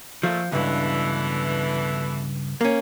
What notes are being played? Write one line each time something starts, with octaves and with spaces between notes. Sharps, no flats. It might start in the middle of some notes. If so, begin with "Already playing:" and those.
A#2 F3 A3
C#2 G2 B2 D3 E3
A#3 C#4